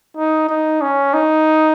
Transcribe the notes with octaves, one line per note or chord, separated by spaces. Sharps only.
D#4
D#4
C#4
D#4